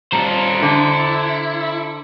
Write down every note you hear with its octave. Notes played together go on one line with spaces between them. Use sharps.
G3 F4 A4 C5 A#5
D3 E4